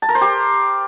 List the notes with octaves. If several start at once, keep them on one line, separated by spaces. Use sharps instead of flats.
A5
A#4
C5
G4